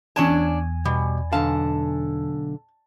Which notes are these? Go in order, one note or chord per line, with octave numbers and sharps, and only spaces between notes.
E2 C#4 D4 G#5 A5
B2 G3
B1 D3 F5 A5